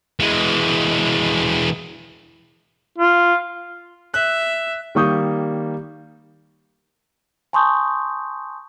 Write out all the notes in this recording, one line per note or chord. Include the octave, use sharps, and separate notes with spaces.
E3 G#3
F4
E5 F#6
D#3 G3 A#3 C#6 D#6 G6
G#5 A5 C6 C#6 D#6 G6